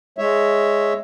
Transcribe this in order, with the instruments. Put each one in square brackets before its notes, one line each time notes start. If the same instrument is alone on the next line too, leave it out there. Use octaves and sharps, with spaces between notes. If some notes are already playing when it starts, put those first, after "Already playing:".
[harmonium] G#3 C#5 E5